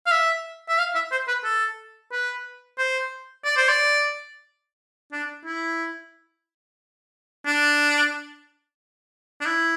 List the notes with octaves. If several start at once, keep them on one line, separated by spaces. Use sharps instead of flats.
F5
E5
E5
F5
E5
C5
B4
A4
B4
C5
D5
C5
D5
D4
E4
D4
D4
E4